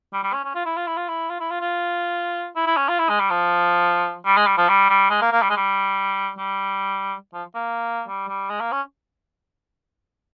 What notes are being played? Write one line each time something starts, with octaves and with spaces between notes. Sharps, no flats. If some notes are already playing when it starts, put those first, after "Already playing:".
G3
G3
C#4
C#4
F4
E4
F4
E4
F4
E4
F4
E4
F4
F4
E4
E4
C#4
F4
E4
G#3
G3
F3
G3
G#3
G3
F3
G3
G3
G#3
A#3
A#3
G3
G#3
G3
G3
F3
A#3
G3
G3
G#3
A#3
C#4